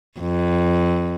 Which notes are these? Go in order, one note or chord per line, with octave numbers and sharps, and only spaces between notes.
F2